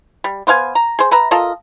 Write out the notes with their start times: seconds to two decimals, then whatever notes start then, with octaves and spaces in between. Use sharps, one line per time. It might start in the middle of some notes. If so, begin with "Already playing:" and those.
0.24 G3
0.47 B3 C5 F5 G#5
0.75 A#5
0.99 G#4 C5
1.11 B4 E5 A#5
1.31 F4 A4 A#4 D#5